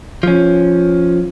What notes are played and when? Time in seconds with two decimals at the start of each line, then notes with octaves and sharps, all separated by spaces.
0.23 F3 C#4